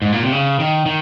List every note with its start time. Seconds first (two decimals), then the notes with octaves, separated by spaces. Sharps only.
0.02 G#2
0.12 A#2
0.23 C3
0.32 C#3
0.60 D#3
0.86 D#3